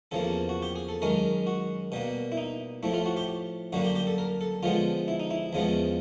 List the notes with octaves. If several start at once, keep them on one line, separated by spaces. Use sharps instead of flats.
E2 C#3 F3 A#3 A4
F#4
G4
G#4
A4
F#2 D#3 G#3 C#4 A#4
F#4
B2 G3 A#3
E4
D#4
A2 F3 A3 E4
F4
F#4
G4
F#2 D3 G3 A#3 F#4
G4
G4
A4
A#4
A4
D3 F3 G#3 B3 F4
E4
D#4
E4
E2 C#3 F3 G#3 B3